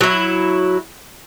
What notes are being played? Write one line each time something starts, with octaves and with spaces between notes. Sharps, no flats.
F#3 E4